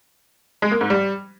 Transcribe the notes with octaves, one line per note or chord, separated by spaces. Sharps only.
G#3
A#3
G#2
G3